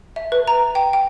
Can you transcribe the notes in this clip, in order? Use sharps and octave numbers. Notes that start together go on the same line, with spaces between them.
E5
B4
A#5
G5
G5